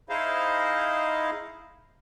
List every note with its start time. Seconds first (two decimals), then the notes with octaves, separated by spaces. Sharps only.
0.09 D#4 E4 G#4 C5 D#5 F5